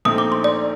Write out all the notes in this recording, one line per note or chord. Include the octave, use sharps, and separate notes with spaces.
A#1 A#2 A3 C4 D#4 D#6
D6
C6
D5